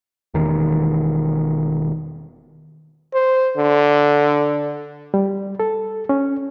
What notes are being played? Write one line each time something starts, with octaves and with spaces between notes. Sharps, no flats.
E1 E2 D#3
C5
D3
G3
A4
C#4